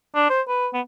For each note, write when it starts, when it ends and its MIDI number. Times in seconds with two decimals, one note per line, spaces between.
0.15 0.28 62
0.30 0.41 72
0.48 0.68 71
0.73 0.81 59